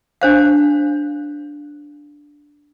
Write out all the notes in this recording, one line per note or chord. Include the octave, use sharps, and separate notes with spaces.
D4 C5 F5